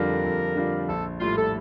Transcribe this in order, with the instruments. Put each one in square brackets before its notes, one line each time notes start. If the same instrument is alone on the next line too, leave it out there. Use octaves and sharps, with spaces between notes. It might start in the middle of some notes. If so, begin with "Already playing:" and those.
Already playing: [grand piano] F2 D3 G3 D4 F4 [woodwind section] A#4
[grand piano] F2
D3 G3 D4 F4
[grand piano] A#1 [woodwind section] A4
[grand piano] A2 G3 [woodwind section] F4
[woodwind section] A4